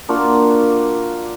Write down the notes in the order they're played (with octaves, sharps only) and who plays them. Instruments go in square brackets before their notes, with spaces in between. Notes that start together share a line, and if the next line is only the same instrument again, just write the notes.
[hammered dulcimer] A#3 D4 F4 F#4